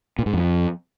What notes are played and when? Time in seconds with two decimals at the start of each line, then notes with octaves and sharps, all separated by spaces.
0.19 A#2
0.26 G#2
0.33 F2